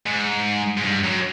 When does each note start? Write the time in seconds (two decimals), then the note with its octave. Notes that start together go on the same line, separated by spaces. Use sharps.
0.06 G#2
0.77 G#2
0.84 G2
1.04 F#2